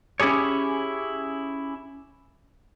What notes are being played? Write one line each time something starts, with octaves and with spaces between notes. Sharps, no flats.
C#4 E4 G4 G#4 C#5